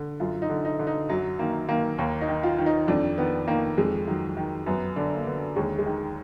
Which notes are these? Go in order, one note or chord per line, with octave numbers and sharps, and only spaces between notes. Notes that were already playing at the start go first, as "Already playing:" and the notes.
Already playing: D3
F#2 F4
D#4
D3
D#4
D3
D#4
F#2 F#3
D#3 A#3
D#3 A#3
D#2 A#3
D#4
D#3
F4
D#3
D#4
F2 D4
D#3 B3
D#3 A#3
F2 G#3
D#3 F#3
D#3
F#2 B3
D3 D4
A#3
D3 B3
D#2 G#3
G#3
D#3